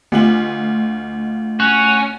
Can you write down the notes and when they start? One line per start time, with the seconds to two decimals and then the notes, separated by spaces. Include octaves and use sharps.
0.12 D2 A3 F4 F#7
1.60 C#4 F#4